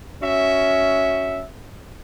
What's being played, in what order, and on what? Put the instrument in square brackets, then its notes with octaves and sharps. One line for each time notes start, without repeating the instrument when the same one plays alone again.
[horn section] C#4 F#4 E5